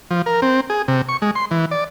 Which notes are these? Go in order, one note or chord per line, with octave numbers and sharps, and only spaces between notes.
F3
A#4
C4
G#4
C3
C#6
G#3
C6
E3
D5